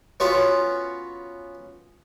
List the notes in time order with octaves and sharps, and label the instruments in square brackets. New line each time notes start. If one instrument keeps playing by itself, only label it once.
[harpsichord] B3 C#4 F4 F#4